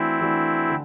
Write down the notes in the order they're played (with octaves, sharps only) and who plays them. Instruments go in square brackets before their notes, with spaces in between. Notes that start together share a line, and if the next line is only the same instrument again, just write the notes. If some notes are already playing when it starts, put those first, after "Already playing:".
Already playing: [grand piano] E3 A3 D4 F#4 [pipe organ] C4 E4
[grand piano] E3 A3 D4 F#4
D3